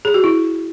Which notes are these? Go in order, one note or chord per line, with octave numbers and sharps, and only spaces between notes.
G#4
F#4
E4